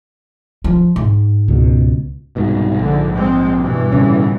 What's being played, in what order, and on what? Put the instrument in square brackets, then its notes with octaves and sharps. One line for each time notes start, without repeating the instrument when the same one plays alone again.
[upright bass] F3
G#2
[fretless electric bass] C#2 B2
[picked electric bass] C2 G#2 B2
[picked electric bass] A#1 [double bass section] G#2 D3
[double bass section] G#3 C4
G2 B2 E3
[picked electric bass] A2 C#3 C#4